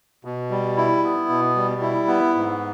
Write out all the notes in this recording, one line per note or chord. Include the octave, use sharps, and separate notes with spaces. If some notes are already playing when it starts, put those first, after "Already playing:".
B2
G3
E4
B3
B2
G3
E4
B3
G#2